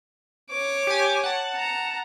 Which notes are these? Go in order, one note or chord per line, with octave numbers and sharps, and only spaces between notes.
C#5 D6
G4 G#5
F#5 A5
A#5